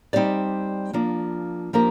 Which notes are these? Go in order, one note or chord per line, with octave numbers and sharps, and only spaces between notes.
G3 C4 D#4 G4 D5
F3 A#3 D4
F3 A#3 D4 G4 A#4